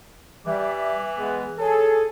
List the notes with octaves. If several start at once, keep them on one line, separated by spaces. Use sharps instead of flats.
E3 G3 E5 D6
G#3 B3
G#4 A4 C#5 G#5